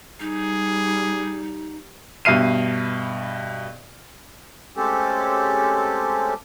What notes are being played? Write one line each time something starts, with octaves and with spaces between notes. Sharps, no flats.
G3 D#4 G#4
G2 B2 E5 F6 C7 D#7
G#3 A3 C4 C#4 G4 A4